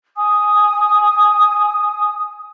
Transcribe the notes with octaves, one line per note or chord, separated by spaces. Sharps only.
G#5 D#6